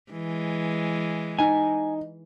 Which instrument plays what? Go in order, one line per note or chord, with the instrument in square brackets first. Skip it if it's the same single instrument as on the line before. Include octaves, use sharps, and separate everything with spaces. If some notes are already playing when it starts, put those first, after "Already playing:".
[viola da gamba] E3 G#3
[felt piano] D#4 [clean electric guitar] G#5